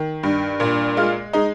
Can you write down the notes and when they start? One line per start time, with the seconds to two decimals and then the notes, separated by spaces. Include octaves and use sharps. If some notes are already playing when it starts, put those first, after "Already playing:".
Already playing: D#3
0.23 G2
0.60 A#2
0.97 G#3 F4
1.33 G#3 D#4